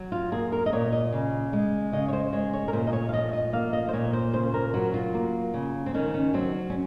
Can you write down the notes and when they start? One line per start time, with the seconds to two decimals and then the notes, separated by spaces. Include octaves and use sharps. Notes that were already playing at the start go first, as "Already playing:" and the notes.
Already playing: F#3
0.12 F4
0.32 A#3 G#4
0.52 A#4
0.66 D#5
0.72 A#2 C#5
0.92 D#5
1.12 C#3
1.53 G#3
1.93 C#3 D#5
2.08 C#5
2.13 C5
2.33 G#3 C#5
2.53 C#5
2.68 A#4
2.73 A#2 C5
2.87 D#5
2.93 C#5
3.09 F5
3.13 F3 D#5
3.33 D#5
3.53 A#3 F5
3.73 D#5
3.89 C5
3.93 A#2 C#5
4.13 C5
4.33 C#3 C5
4.54 A#4
4.74 F#3 F#4
4.94 F4
5.14 A#3
5.54 C#3
5.86 C4
5.94 D#3 C#4
6.14 C#4
6.34 F#3 C4
6.70 C#4